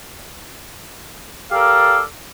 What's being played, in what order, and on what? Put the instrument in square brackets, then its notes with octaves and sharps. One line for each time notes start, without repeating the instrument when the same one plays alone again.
[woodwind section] G4 A4 A#4 D5 F5